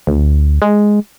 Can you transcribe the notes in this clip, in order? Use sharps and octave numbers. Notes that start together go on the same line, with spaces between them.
D2
G#3